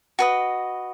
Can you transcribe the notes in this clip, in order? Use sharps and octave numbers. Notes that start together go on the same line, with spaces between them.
F#4 B4 D#5